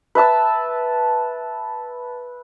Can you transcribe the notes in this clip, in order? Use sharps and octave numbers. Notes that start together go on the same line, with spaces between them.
B4 E5 A5 E6